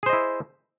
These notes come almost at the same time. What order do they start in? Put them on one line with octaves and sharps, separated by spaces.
G#4 C5 D#5 E4